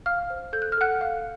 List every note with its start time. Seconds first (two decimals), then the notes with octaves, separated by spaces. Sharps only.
0.06 F5 F6
0.30 C5
0.53 A4 G6
0.62 F#6
0.72 F6
0.77 A4 F#5 F#6
1.01 F5